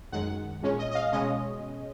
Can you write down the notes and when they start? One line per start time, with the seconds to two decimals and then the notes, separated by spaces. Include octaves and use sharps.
0.12 F#2 D#3 G#3 F#5
0.62 A#2 G#3 C#4
0.79 D#5
0.91 D#5
0.95 F5
1.12 B2 G#3 C#4 D#5